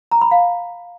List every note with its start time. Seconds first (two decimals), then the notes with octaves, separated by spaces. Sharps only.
0.11 A#5
0.21 B5
0.31 F5